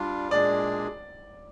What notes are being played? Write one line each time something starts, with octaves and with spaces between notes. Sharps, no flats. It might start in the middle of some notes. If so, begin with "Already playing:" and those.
Already playing: G3 D4 F4
A#2 G#3 D4 G#4 D5